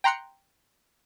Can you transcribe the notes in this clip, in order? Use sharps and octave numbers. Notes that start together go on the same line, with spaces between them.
G5 A#5 C6 F#6 C#7